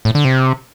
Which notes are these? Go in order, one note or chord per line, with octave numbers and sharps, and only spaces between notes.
A2
D3
C3